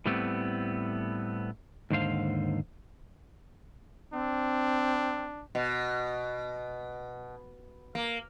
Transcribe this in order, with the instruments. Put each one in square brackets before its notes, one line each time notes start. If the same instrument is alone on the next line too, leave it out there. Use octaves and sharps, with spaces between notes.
[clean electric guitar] A2 G3 A3 B3 C4
D#2 G#2 D3 C5 F5
[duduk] C4 [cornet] D4
[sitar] B2
A#3